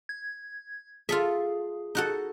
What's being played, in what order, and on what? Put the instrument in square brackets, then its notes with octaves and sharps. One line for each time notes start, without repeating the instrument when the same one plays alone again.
[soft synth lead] G#6
[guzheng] F4 A4 E5 [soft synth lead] G#4
[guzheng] D#4 F#4 A4